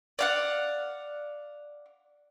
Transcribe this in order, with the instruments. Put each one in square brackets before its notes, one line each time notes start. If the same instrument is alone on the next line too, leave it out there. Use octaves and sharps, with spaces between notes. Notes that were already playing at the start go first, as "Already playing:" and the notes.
[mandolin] D5 F5 F#5